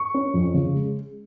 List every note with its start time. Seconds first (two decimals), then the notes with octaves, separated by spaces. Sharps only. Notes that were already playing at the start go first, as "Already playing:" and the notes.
Already playing: C#6
0.14 C#4
0.34 F2
0.54 C#3
0.74 G#3